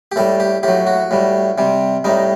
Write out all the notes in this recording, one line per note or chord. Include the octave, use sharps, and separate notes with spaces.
G4
A2 G3 A4
G4
A2 F#3 G4
F#4
A2 G3
C3 G3
A2 G3 D#4